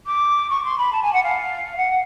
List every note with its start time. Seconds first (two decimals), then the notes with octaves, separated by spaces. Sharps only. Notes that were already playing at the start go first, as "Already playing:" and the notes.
0.06 D6
0.49 C#6
0.64 C6
0.77 B5
0.92 A5
1.02 G#5
1.12 F#5
1.23 F5
1.76 F#5